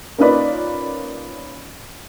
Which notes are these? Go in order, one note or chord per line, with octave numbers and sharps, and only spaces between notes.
A#3 C#4 D#4 F4 B4 D5